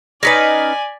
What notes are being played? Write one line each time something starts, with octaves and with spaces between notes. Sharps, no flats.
C#4 D#4 B4 D5 G#5 A#6 B6